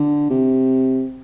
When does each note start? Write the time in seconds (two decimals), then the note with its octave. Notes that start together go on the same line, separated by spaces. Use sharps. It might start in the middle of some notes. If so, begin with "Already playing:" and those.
Already playing: D3
0.31 C3